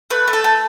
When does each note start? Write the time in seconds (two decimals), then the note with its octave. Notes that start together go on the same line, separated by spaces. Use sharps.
0.10 A3 B4
0.28 A3
0.33 A4
0.44 A3